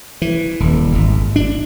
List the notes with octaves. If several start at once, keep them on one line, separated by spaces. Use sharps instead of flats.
E3
D#1
G#1
D4